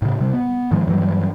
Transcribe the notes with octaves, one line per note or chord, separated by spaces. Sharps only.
A2 C#3
C3 G3
B3
G#2 D#3 F3 G#3
G2 E3 F#3 G3